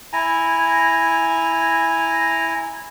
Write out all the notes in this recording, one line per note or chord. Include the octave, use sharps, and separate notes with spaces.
E4 G#5 A#5